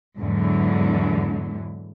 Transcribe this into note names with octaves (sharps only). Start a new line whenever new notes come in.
E2 G#2 D3 E3 F#3